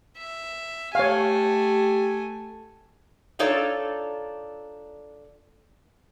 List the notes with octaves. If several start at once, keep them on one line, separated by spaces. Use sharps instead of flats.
E5
A3 G4 C#5 F5 G#5
D4 D#4 F4 A4 C#5 D5